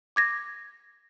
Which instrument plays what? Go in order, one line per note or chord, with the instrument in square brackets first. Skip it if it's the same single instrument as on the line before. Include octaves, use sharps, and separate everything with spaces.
[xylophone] D6 G#6 A#6